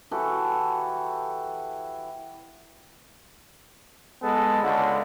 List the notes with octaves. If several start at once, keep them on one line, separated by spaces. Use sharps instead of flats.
E3 F#4 G4 A4
G#3 B3 A4
C#2 D3